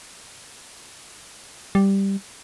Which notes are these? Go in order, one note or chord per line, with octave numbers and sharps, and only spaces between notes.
G3